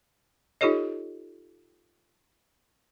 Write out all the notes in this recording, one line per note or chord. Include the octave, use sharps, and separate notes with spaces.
D#4 F4 G4 A4 C#5 D#5